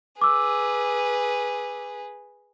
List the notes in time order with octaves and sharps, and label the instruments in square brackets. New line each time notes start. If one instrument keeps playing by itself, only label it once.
[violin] G#4 B4 [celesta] D6 E6